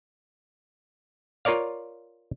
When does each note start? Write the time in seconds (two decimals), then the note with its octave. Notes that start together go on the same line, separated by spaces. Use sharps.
1.45 F4 A#4 C#5 D5 F5